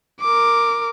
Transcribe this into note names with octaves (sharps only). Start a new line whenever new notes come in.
A#4 D6